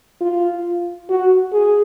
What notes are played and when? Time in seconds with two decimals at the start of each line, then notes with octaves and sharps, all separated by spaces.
0.20 F4
1.09 F#4
1.52 G#4